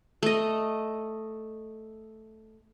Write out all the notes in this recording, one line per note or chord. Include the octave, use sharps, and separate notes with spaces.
A3 D#5